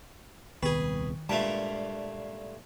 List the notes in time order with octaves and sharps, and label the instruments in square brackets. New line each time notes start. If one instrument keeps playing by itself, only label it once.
[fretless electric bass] D#1 C2 B3 [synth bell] D#3 [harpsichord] G#4 B4
[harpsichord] G2 A#2 A3 [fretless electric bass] G#3 [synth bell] A5 D7 F7